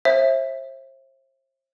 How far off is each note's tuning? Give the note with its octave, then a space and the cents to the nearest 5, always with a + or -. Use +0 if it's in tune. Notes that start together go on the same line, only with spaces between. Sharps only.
C5 +40 E5 +0